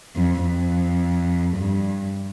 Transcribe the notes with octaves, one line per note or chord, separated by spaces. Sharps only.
F2
F2
G2